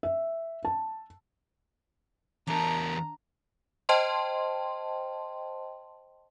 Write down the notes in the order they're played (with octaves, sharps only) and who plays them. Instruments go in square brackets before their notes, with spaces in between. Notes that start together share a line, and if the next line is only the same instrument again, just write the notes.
[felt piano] E5
A5
[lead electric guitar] E2 A#4 [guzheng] D4 [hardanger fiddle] A#5
[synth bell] C5 D#5 G5 A5 C6